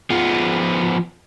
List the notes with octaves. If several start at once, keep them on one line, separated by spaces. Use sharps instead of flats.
F3 B3